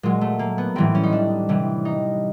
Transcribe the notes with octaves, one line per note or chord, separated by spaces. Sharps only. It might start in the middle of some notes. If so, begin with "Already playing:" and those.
A#2 F#3 G#3
A3
A#3
B3
A2 E3 G3 C4
C#4
D#4
D4
C3 E3 G3
D#4